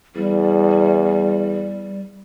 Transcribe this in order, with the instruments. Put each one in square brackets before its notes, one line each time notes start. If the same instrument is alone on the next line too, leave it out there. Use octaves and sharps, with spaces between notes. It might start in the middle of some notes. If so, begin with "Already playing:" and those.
[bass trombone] E2 [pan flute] G3